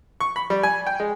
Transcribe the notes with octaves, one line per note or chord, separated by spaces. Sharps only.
C#6
B5
G3
G#5
G5
G#3